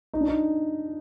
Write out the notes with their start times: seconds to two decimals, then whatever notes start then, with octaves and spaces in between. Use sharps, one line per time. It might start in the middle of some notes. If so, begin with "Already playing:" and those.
0.14 D#4
0.21 D4
0.28 D#4